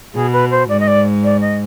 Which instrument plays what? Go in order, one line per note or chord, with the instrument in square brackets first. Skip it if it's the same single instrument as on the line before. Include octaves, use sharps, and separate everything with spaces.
[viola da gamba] B2 [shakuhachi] G#4
[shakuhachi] B4
C5
[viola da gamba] G#2 [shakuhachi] D5
[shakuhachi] D#5
D5
D5
D#5